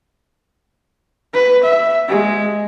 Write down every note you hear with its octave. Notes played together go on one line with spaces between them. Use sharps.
B4
E5
G#3